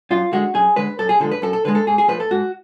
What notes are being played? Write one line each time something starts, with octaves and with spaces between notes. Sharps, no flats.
F#2 F4
D3 G#3 F#4
F#2 G#4
D3 G#3 B4
F#2 A4
G#4
D3 F3 G#3 A4
B4
F#2 A4
A4
D3 F3 G#3 B4
A4
G#2 G#4
G#4
F3 A3 B4
A4
G#2 F#4